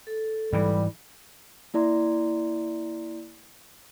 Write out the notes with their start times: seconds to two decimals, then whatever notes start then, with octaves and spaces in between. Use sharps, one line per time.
0.07 A4
0.53 G#2 E3 G3
1.74 A#3 E4 D5 A#5 C6